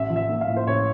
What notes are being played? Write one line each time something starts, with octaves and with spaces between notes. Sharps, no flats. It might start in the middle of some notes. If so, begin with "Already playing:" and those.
Already playing: A1 E5
F3
E5
A#3
F5
A2
C5
A1 C#5